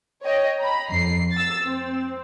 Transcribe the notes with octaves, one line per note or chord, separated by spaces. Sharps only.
C#5 D#5 G5
A#5 B5
F2 C7
E6 A6
C4